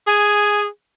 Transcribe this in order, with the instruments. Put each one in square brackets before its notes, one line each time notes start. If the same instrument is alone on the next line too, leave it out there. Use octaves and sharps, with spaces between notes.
[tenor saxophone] G#4 [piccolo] G#5